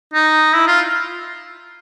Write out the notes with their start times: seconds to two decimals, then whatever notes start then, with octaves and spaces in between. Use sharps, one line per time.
0.13 D#4
0.54 E4
0.67 F4